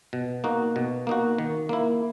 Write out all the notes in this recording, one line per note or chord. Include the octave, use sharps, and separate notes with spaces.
B2
A#3 D#4 F#4
B2
A#3 D#4 F#4
D#3
A#3 E4